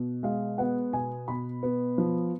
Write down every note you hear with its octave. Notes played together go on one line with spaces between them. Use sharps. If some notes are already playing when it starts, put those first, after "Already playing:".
Already playing: B2
G#3 F5
B3 F#5
B2 G#5
B2 B5
B3
F3